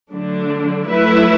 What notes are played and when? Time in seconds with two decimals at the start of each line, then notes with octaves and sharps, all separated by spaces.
0.12 D3 F#3 A3 D4
0.86 F#3 A3 E4 B4 E5